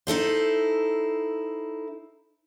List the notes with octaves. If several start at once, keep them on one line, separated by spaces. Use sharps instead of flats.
D#4 E4 A4 C5